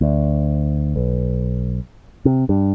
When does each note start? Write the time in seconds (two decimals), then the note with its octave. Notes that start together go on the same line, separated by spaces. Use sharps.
0.01 D2
0.96 B1
2.25 C3
2.49 G2